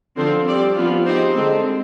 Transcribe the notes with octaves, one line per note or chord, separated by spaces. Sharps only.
D3 F3 C4 F4 C5
G3 C4 G4 D5
F3 B3 F4
G#3 C4 D#4 G4 C5
D3 G#3 C4